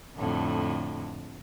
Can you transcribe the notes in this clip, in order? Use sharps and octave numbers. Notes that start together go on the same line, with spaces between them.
F2 A2 D3